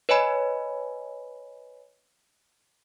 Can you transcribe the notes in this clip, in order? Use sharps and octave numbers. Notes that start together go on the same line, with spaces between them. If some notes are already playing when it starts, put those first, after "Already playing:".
B4 C#5 D#5 G#5 B5